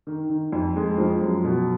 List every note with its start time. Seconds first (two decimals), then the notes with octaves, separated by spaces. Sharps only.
0.07 D#3
0.30 D#3
0.52 F2
0.76 G#3
0.98 F3
1.21 F#2
1.44 B2